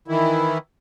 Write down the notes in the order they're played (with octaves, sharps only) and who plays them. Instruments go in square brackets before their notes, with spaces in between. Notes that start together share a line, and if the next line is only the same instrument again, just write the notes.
[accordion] D#3 E3 E4